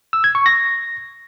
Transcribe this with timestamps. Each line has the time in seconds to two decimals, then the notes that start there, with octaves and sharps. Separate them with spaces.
0.13 E6
0.24 G#6
0.35 C#6
0.46 A#6